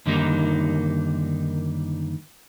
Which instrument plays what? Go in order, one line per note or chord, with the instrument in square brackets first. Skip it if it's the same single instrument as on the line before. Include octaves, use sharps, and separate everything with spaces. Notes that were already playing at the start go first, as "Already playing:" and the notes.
[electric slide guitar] F#2 D3 D#3 G3 A#3 D#4